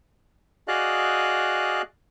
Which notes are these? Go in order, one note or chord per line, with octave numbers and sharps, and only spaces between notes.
F#4 G#4 D5 D#5 F5 F#6